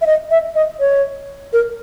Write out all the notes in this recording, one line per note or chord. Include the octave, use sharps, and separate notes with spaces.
E5
D#5
E5
D#5
C#5
A#4